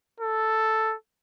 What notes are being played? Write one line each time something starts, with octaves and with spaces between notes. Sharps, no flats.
A4